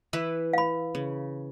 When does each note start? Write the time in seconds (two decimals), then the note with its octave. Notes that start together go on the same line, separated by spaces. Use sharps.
0.13 E3 E4 B4
0.53 F5 B5
0.95 C#3